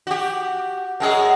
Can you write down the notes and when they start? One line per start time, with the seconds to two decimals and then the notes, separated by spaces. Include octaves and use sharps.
0.07 F#4 G4
1.00 F#2 G#3 G#4